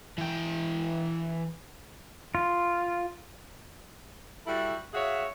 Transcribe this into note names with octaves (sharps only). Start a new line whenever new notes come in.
E3 G5
F4
G3 E4 F#4 A4
F#4 G#4 C#5 E5 F5